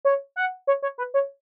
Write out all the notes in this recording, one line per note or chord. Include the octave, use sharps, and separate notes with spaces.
C#5
F#5
C#5
C#5
B4
C#5